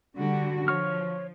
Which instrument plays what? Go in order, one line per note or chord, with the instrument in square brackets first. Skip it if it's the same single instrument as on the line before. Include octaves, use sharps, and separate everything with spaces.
[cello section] D3 G3 F#4
[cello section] F3 [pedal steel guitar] C#5 C#6 F6